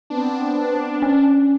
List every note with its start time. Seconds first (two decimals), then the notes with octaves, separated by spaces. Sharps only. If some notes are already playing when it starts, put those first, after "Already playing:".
0.10 B3 C4 D4
1.02 C#4